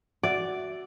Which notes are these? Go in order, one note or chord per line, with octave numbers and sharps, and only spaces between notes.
F#4 D5 E5 F#5